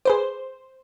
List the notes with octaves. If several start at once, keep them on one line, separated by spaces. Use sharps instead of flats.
G#4 B4 C5 D6